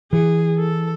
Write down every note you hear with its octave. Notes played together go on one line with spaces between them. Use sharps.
E3 G#4
A4